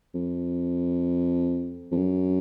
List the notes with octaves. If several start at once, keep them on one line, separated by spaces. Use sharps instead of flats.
F2
F2
F#2